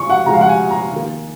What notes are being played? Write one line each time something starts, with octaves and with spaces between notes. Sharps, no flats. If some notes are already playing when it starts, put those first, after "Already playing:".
Already playing: C#3 F3 G#3 C#6
F#5
C#3 F3 G#3 A#5
F5
F#5
G#5
A#5
D#3 A#3